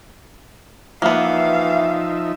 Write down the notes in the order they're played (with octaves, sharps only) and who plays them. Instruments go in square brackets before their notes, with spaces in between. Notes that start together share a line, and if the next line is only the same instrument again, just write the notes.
[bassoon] E3 [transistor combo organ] F3 D#4 E5 [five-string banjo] A#3 B3 [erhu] F5